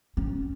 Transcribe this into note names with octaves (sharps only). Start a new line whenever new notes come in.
C#4